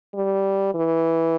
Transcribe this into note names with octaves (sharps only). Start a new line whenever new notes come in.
G3
E3